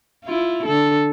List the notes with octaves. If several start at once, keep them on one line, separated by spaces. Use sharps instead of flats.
E4 F4
D3 A4